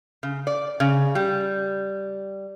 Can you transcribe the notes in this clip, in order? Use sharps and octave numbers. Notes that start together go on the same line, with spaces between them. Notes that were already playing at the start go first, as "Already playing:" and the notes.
C#3
D5
C#3
G3